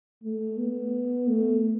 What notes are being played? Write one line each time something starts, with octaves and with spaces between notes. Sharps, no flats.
A3
B3
A3